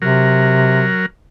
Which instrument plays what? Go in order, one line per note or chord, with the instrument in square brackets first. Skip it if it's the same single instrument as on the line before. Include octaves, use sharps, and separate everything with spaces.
[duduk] C3 [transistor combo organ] F#3 A#4